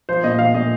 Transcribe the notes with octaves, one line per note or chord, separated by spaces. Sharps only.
F3 C5
A#2 D#5
F3 F5
A#2 D#5